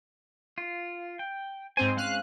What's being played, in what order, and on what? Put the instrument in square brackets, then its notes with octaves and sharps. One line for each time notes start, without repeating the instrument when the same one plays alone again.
[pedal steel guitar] F4
G5
[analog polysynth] G#2 C4 C5 [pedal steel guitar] G#5
[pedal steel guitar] G#3 C#4 [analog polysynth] F5 F#6